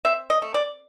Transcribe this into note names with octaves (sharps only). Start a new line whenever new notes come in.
C4 E5
D#5
A3
D5